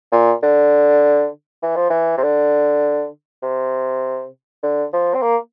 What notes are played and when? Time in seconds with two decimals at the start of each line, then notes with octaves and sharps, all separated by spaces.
0.12 A#2
0.43 D3
1.62 E3
1.76 F3
1.90 E3
2.17 C3
2.23 D3
3.42 C3
4.63 D3
4.93 F3
5.14 C4
5.22 A#3